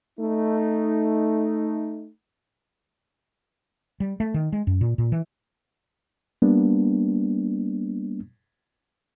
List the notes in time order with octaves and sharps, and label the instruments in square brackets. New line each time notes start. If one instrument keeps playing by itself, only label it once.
[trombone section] A3 D#4
[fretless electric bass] G3
A3
D#3
G#3
F#2
A#2
A#2
E3
[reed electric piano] G3 A#3 B3 D4